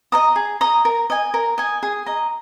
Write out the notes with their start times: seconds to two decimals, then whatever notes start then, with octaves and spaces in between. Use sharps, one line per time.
0.12 D#5 A#5 D#6
0.36 G#4
0.61 D#5 A#5 D#6
0.85 A#4
1.10 D#5 G#5
1.34 A#4
1.58 D#5 G#5
1.83 G#4
2.06 D#5 A#5